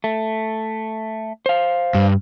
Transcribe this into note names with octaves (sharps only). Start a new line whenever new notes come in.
A3
C5 F5
G2